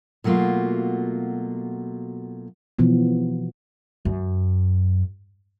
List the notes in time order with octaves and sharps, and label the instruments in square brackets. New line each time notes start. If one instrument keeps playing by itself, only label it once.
[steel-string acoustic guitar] B2 F#3 A3 A#3 F4
[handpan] B2 E3 F3 B3
[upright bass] F#2